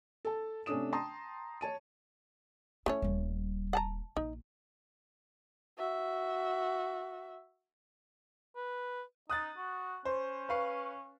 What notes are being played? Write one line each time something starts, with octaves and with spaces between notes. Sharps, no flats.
A4 A5
C3 A3 C#4 D4 D#6 E7
G5 A5 A#5 C6 D#6
C#5 A5 D#7
A3 C#4 E4 C#5
D#1 G3
F#5 A5 A#5
A#1 D#4
F#4 E5
B4
D#4 D#6 F#6 A6
F#4
C#4 C5
B4 F5 C#6